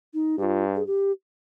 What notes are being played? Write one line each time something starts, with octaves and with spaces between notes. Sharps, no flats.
D#4
G2 F4 G4
G#4
G4